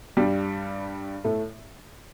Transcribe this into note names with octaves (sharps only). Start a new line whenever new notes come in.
G2 G3
A2 A3